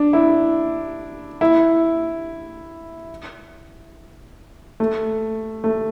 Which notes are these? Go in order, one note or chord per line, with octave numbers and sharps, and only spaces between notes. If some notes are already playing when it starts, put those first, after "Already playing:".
Already playing: D4
E4
E4
A3
A3